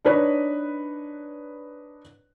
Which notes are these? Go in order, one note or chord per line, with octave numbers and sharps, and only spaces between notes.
D4 D#4 B4 C#5